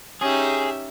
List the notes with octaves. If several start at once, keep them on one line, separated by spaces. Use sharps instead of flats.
C#4 D#4 G4 G#4 E5